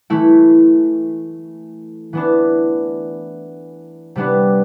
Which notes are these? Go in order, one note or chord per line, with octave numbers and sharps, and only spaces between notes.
E3 A3 E4
E3 B3 D4
C3 G3 B3 D4